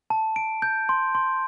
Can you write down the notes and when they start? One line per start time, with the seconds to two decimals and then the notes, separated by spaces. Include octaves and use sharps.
0.10 A5
0.36 D7
0.62 G6
0.89 C6
1.15 C6